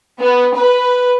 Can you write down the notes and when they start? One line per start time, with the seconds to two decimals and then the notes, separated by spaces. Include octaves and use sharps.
0.19 B3
0.56 B4